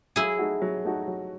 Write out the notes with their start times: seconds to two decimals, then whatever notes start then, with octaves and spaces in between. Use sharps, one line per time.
0.16 F#3 E4 G#4
0.39 A3 D#4 F#4
0.62 F#3
0.85 A3 D#4 F#4
1.07 F#3